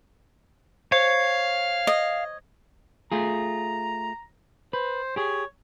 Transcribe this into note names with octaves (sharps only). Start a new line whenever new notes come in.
C5 C#5 F5
D#5
A3 F4 G#4 A#5
B4 C5
G4 G#4 C#5